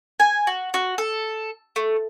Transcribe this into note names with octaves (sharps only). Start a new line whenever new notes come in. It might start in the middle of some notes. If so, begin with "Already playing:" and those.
G#5
F#4
F#4
A4
A3